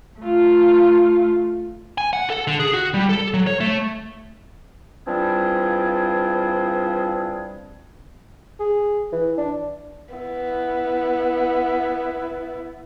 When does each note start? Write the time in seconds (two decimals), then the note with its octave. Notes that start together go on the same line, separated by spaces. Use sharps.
0.21 A3 F4
1.98 G#5
2.13 F#5
2.30 A4
2.47 D3
2.60 G#4
2.74 F#4
2.94 G3
3.09 A4
3.34 F#3
3.47 C#5
3.60 A3
5.07 E3 F3 G3 C4 D4 G#4
8.60 G#4
9.12 E3
9.38 D4
10.15 B3 E4